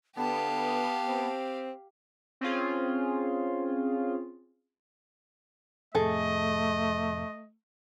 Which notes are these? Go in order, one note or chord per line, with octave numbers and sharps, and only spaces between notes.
D3 B3 G4 F5 A5
C4
C4 C#4 F4 G#4
F2 A2 C3 A3 G#4 A4 D#5